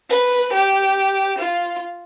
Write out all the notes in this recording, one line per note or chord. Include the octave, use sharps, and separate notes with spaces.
B4
G4
F4